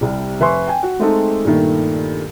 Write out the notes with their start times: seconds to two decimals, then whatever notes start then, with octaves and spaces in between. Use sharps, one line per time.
0.01 C2 C3 G3
0.40 F1 B4 E5 G#5 C6 C#6
0.68 G5 G#5
0.83 F#4
0.99 G#3 A3 C4 D#4 G4 A4
1.45 G2 A#2 D#3 A3